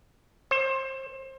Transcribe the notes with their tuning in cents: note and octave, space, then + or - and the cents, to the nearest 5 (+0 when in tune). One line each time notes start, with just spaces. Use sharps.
C5 +30